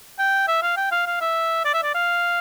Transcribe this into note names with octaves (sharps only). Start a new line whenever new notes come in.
G5
E5
F5
G5
F5
F5
E5
D5
E5
D5
F5